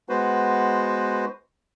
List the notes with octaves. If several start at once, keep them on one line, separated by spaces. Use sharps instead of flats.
G#3 B3 F#4 B4 C5